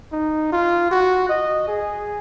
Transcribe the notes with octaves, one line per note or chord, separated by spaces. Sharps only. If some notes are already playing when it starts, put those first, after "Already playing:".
D#4
F4
F#4
D#5
G#4